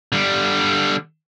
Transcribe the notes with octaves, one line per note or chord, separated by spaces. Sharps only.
D3 G3